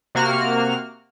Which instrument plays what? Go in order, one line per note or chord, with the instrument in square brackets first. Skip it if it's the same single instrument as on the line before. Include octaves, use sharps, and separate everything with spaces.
[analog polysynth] C3 A#3 F#4 F6